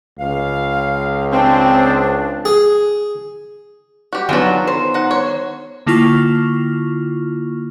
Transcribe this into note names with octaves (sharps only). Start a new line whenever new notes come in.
C#2 F5
C4 D4
G#4
F#4 G4
D#3 F#3 B3 C#4 D4 F4 F#4
C5
D#4 F#5
C#5
D3 A#3 E4 F4 C#6 F6